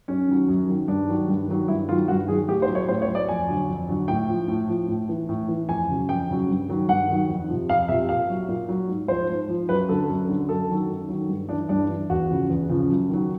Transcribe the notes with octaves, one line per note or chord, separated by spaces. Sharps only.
F#2 C#4
D#3 F#3
F#2
D#3 F#3
G2 D4
D#3 F#3
G2
D#3 F#3
G2 E4
D#3 F#3 F4
G2 F#4
D#3 F#3 G#4
A2 G4
C5
F#3
C#5
A2 C5
C#5
F#3
D5
F2 G#5
D3 F#3
F2
D3 F#3
A2 G5
F3
A2
F3
A2
E3
A2
E3
F2 G#5
C#3 F#3
F2 G5
C#3 F#3
G2
D#3 F#3
G2 F#5
D#3 F#3
F2
C3 F3
F2 F5
C3 F3 E5
A#2 F5
F#3
A#2
F#3
G#2
F3 C5
G#2
F3
F#2 B4
D3 F#3 A4
F#2
D3 F#3
F#2 A4
D#3 F#3
F#2
D#3 F#3
G2
E3 D4
G2 D4
E3
E2 F#4
C#3 F3
E2
C#3 F3
F#2
D#3 F#3